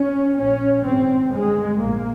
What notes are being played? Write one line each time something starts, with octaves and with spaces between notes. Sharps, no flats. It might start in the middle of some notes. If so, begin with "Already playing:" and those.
Already playing: C#4
A#1 A#2 C#4
G#1 G#2 C4
G1 G2 G#3
A#1 G#2 A#3